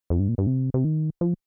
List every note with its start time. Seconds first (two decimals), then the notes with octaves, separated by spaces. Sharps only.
0.10 F2
0.20 G2
0.28 A#2
0.38 G2
0.47 C3
0.74 C3
0.84 D#3
1.21 F3